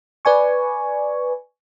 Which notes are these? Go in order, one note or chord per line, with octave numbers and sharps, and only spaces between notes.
B4 D5 G#5 C#6